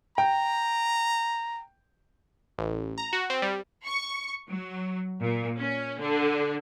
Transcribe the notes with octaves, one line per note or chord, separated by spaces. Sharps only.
G5 A#5
A1
A#5
F#4
C4
G3
C#6
F#3
A#2
C#4
D3